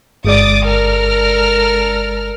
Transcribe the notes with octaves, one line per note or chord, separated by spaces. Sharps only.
G1 G#3 D5 D6 D#6 A6
A4 A#4 F6